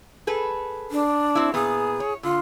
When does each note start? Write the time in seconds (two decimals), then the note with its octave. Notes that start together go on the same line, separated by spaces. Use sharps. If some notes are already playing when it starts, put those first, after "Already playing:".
0.27 G#4 A4 B4
0.91 D4
1.35 C4 E4
1.54 A#2 B3 G#4
2.00 C#5
2.23 D3 F4